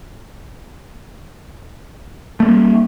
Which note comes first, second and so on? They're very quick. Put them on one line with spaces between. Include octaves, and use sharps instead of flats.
A3 G3 A#3